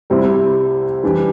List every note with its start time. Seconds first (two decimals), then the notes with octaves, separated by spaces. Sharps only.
0.10 C2 C3 G3 C4 E4
1.03 E3 G3 D4 G4